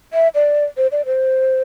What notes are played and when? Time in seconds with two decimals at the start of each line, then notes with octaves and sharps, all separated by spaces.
0.13 E5
0.35 D5
0.77 C5
0.92 D5
1.06 C5